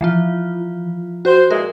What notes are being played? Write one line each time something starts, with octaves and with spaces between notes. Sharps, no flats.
E3 F3 F4
F#4 C5
A#2 E3 G#3 A#4